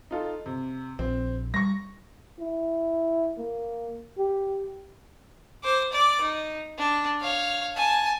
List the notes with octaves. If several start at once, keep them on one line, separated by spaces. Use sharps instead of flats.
D#4 F4 A4
C3
A#1 C4
G3 C#6 A#6
E4
A#3
G4
C5 D6
D5 D6
D#4
D4
C#5 F5
G#5 A5